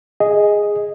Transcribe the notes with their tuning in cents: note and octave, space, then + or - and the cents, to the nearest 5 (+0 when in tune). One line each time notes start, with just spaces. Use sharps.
G#4 -5 D#5 +5